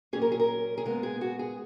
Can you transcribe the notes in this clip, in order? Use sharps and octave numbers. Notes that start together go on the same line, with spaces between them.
A#2 F#3 C#4 G#4
A#4
G#4
A#4
G#4
A#2 G#3 B3 A#4
G#4
F#4
G#4